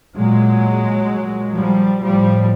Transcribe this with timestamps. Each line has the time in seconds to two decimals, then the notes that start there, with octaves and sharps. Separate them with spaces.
0.17 A#2 F#3 G#3
1.09 A#2
1.55 F3 G3
2.02 A2 F3 G3